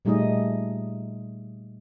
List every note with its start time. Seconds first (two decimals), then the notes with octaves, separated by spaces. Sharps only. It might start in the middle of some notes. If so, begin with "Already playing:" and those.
0.05 A#2 G3 A3 D#4 G#4 D#5